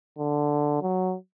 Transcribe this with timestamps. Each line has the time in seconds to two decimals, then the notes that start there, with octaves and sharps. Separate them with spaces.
0.18 D3
0.82 F#3